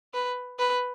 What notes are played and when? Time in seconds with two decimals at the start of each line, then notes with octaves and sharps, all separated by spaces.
0.14 B4
0.59 B4